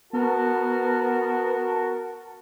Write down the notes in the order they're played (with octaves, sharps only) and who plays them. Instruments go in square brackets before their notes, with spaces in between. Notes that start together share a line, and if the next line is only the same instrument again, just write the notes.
[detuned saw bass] B3 [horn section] F#4 A#4 A5